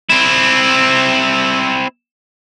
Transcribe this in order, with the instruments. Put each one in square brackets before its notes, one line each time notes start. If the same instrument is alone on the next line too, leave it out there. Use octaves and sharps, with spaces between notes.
[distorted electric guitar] C4 E4